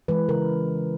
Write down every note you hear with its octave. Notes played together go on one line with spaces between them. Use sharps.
E3 G#3 B4
C#3 A#4